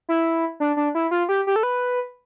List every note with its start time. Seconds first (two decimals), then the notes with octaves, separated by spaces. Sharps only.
0.09 E4
0.60 D4
0.77 D4
0.95 E4
1.11 F4
1.29 G4
1.47 G4
1.56 A4
1.63 B4